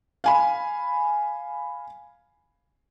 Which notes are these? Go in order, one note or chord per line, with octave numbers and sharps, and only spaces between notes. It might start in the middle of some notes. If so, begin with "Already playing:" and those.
F5 G#5 B5